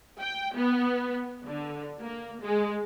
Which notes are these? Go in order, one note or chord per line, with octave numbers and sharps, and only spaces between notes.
G5
B3
D3
A#3
G#3